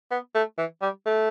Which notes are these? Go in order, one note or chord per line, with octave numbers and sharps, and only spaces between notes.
B3
A3
E3
G3
A3